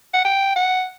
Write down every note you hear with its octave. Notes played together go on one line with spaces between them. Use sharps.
F#5
G5
F#5